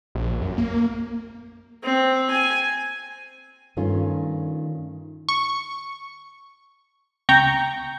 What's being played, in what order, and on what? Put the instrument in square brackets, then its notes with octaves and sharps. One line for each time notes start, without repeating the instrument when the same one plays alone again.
[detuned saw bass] A#1
F#2
A#3
[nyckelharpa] C4
G#5
[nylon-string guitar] G2 D#3 A3 C#4 F4
[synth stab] C#6
C#2 G5 A#5 C#6